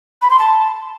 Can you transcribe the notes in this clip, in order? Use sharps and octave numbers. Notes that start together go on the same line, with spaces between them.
B5
C6
A5